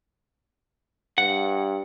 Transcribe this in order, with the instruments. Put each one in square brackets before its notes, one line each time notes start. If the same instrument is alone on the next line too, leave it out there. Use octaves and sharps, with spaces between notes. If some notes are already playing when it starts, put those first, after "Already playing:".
[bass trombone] G2 [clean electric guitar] F#5